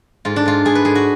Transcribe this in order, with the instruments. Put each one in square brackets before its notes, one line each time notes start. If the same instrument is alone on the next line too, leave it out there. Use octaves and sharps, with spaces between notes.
[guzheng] G#2 F4
D4
G#2 F4
G#2 G#4
B4
G#2 G#4
F#4